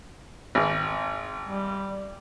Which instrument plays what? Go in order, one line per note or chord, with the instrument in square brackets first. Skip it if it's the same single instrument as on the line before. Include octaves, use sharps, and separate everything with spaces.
[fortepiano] G#1
[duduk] G3